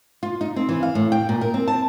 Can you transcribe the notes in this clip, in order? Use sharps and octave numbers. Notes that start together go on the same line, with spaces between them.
F4
D#4
C4
E3
F5
A2
G5
A#2
A#4
C4
A5